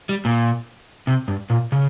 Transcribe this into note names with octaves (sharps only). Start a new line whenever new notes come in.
G3
A#2
C3
G2
A#2
C#3